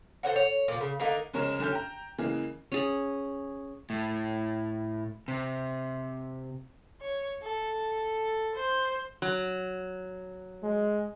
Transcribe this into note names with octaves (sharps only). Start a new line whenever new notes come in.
A4 C5 C#5 F#5
C#5
A#2 F3
C#3
D3 A3 A#3 D#4
F1 C#3 G#3 A#4 C#5 E7
F#1 D3 C#4 F6 G6
G5 A#5
C#3 E3 G#3 A#3
C#4 G#4
A2
C3
C#5
A4
C5
F#3
G#3